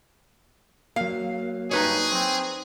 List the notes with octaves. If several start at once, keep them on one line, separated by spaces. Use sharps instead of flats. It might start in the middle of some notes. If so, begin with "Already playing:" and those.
F#3 A#3 F5
G2 D#4 G#4 B4 C#5
C4